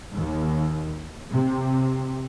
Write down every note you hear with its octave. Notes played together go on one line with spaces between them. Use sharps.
D#2
C3